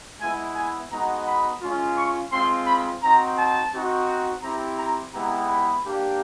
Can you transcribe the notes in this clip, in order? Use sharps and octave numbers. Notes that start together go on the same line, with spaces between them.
G#3 B3 E4 G#5
G#5
G#3 B3 D#4 F#4 A#5
B5
G#3 C#4 F4
C#6
G#3 C4 F4 C6
B5
C4 D#4 F#4 A#5
A5
C4 D#4 F#4
C4 E4 G4 A#5
A#5
G#3 B3 E4 G4 A#5
B5
A#3 D4 G4